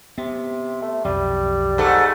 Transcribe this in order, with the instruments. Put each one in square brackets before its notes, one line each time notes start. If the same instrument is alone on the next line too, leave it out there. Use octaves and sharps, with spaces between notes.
[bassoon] C3 [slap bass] B3
[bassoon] A3
[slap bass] B1 F2 [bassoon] G3
[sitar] G#2 A3